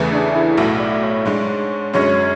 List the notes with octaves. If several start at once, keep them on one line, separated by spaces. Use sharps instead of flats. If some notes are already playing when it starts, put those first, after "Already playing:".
Already playing: E2 C#3 E3 A3
D4
E4
B1 A2 F#3 A3 E4 F#4
D5
C#5
G#2 G#3 D4
F#2 D3 G#3 C#4 C#5